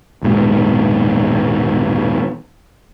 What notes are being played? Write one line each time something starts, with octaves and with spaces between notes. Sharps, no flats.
D#1 G#2 B2